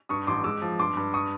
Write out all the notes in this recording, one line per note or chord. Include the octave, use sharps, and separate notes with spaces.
G2 C#6 D#6
A1 C6 D6
G#3 D6 E6
F3
G2 C6 D6
G2
C#6 D#6